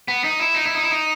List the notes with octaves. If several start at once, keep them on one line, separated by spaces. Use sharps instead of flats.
B3
D#4
E4
D#4
E4
D#4
E4
D#4